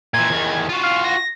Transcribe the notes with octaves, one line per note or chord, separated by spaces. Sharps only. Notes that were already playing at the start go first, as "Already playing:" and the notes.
A#2 E3 G#6
E2 D#3
F4 F#4
F5
A#6